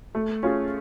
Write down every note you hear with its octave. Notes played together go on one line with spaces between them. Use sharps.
A3
C#4 F4 G#4